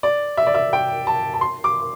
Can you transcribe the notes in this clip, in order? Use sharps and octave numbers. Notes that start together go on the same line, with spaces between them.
D5
E5
D5
E5
G5
A5
A5
C6
D6